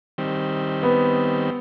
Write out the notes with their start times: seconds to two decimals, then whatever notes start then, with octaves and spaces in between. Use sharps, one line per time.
0.18 D#3 G3 C4
0.83 B3